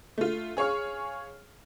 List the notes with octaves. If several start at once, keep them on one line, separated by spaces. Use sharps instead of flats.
A3 F4
G#4 C#5 F5 C#6 F6